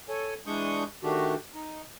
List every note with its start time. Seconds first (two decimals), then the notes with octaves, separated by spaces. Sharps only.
0.09 A4 C#5 G#5
0.47 E3 G#3 D4 C#6 D#6 G6
1.03 D#3 A3 D4 F#4 G4
1.55 D#4